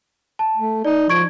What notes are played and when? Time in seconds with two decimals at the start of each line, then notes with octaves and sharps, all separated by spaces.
0.39 A5
0.56 A3
0.85 D#4 D5
1.10 F3 C#6 G#6 D7